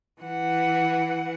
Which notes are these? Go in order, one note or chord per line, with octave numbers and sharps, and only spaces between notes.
E3 F#5